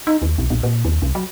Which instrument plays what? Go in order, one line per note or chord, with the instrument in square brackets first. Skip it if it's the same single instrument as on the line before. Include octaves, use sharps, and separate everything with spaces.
[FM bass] D#4
D#2
B1
A#1
A#2
D#2
C2
F#3